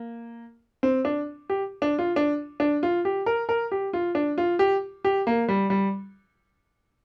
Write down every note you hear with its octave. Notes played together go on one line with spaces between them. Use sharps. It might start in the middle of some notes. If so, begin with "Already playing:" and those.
Already playing: A#3
C4
D4
G4
D4
F4
D4
D4
F4
G4
A#4
A#4
G4
F4
D4
F4
G4
G4
A#3
G3
G3